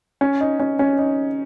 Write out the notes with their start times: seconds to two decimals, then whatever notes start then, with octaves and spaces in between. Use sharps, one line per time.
0.21 C#4
0.41 D#4
0.60 C#4
0.79 C#4
0.99 D#4